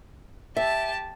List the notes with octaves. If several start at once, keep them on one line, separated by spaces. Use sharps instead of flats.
G4 E5 A5